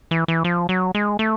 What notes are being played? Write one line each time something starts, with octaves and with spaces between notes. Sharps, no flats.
E3
E3
F3
F#3
G#3
A3